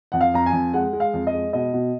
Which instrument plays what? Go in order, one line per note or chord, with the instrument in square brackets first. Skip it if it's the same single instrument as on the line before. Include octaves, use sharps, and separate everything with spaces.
[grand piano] F2 F#5
F5
F2 A#5
G#5
F2
G#3 F#5
G#3
F5
F2
D#5
G#3
B2 D#5
B2